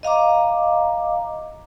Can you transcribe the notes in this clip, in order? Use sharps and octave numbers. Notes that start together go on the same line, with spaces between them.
D#5 F5 A#5 D6